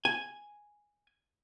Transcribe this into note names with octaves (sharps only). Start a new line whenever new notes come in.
G#5